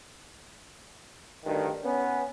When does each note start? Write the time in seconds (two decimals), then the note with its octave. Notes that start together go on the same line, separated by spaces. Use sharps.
1.45 D2 G2 D#3
1.83 B3 C#4